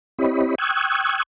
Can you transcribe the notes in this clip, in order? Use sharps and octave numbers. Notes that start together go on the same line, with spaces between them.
C4 E4 G4 C#5 D#5 B5
G5 C#6 D#6 E6 F#6 G#6